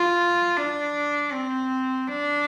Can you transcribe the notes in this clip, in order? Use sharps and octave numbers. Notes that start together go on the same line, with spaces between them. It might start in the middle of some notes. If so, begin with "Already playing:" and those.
Already playing: F4
D4
C4
D4